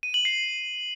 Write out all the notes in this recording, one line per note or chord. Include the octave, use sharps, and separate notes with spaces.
D#7
F#7
C7